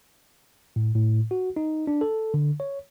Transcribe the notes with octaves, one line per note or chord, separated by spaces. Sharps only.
A2
A2
F#4
D#4
D4
A4
D3
C#5